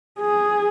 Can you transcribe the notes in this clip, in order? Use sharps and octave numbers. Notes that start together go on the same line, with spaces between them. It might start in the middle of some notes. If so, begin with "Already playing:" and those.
G#4